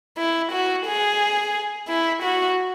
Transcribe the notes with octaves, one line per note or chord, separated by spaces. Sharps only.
E4
F#4
G#4
E4
F#4